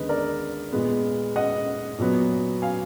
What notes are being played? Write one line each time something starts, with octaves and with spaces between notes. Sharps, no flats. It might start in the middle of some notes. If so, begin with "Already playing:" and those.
Already playing: D#2 D3 G#3 B3 B4 D#5
A#4 D5
A#2 G#3 B3
D#5 F#5
A#2 F#3 B3
F5 G#5